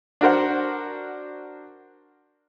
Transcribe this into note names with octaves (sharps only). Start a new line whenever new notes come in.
D4 F#4 A#4 C5 F#5